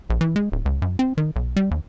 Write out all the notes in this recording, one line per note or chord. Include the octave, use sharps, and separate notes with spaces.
A#1
E3
G#3
D1
C#2
F#2
C4
D#3
B1
G3
D#2